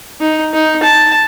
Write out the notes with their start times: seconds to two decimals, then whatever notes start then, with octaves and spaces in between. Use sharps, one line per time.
0.21 D#4
0.54 D#4
0.83 A5